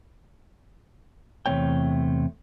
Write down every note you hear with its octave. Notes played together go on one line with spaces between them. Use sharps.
E2 C3 A3 A#3 C#5 G5